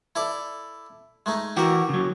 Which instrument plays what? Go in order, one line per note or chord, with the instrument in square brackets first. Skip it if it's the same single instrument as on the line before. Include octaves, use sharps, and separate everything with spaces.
[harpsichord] E4 A4 D5
G#3 A3 D#4
[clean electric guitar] E3 F#4 [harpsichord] G4 A#4
[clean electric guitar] C#3 F#3